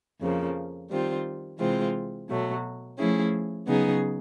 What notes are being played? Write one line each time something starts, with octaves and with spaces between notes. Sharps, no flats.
F2 C#3 F3 A#3
D#3 G3 C4 F4
C3 E3 G#3 C4 F4
B2 F#3 A3
F3 A3 C#4 E4 G#4
C#3 F#3 B3 D#4 G#4